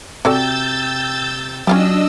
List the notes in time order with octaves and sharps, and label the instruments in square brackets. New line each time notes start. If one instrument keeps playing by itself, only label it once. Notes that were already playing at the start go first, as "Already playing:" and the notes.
[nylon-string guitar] C3 [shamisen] F#4 A4 D5 [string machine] E6 G6 A6
[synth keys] F#3 [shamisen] C#4 F4 G4 [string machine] D4 D#5 E6